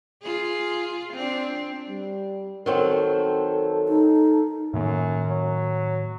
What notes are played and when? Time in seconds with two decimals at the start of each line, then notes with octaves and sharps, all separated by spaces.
0.22 F4 G#4
1.14 C4 D4
1.89 G3
2.66 D#3 F#3 C4 A4
3.88 D#4
4.74 F#2 A2 D#3 A#3
5.30 F#3